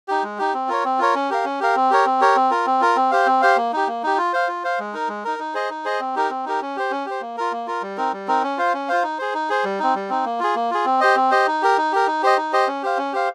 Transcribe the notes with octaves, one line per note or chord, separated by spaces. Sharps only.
D#4 G4
G#3
D#4 G4
C4
F4 A#4 C#5
C4
F4 A#4 C#5
C#4
G4 A#4 F5
C#4
G4 A#4 F5
C4
G4 A#4 C#5
C4
G4 A#4 C#5
C4
F4 A#4
C4
F4 A#4
C4
G4 C5 F5
C4
G4 C5 F5
A#3
D#4 G4
A#3
D#4 G4
F4
C5 F5
F4
C5 F5
G#3
D#4 A#4
G#3
D#4 A#4
D#4
G#4 C5 D#5
D#4
G#4 C5 D#5
C4
D#4 G4 A#4
C4
D#4 G4 A#4
C#4
G4 C5
C#4
G4 C5
A#3
F4 A#4
A#3
F4 A#4
G3
C4 D#4 A#4
G3
C4 D#4 A#4
C#4
F4 C5 F5
C#4
F4 C5 F5
D#4
G#4 C5
D#4
G#4 C5
G3
C4 D#4
G3
C4 D#4
A#3
F4 G#4
A#3
F4 G#4
C4
G4 C5 D#5
C4
G4 C5 D#5
D#4
G4 A#4
D#4
G4 A#4
D#4
G4 C5 D#5
D#4
G4 C5 D#5
C#4
G4 C5 F5
C#4
G4 C5 F5